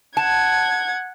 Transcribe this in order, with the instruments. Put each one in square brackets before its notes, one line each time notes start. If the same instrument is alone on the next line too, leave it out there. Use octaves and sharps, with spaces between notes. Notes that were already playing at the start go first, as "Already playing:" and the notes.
[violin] F#5 G#6 [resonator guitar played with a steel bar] A5